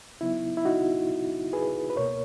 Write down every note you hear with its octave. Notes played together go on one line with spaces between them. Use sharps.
C#3 F#3 B3 D#4 E4
E4
D#4 F#4
G#4 B4
B4
C#2 B2 A#3 A#4 C#5